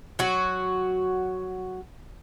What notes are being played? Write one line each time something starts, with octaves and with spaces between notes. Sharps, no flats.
F#3 F#4